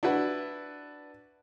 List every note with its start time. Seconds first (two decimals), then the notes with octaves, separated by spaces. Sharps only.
0.03 D4 E4 F#4 B4